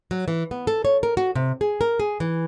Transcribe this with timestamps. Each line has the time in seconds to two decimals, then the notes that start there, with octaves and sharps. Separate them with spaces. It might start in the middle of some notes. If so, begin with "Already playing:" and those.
0.11 F#3
0.28 E3
0.51 B3
0.67 A4
0.85 C#5
1.03 A#4
1.17 F#4
1.35 C3
1.61 G#4
1.81 A#4
2.00 G#4
2.20 E3